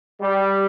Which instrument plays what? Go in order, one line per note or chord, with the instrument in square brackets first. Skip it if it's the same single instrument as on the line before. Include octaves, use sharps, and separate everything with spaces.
[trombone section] G3